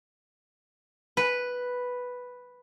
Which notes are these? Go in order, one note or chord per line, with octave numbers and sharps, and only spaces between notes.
B4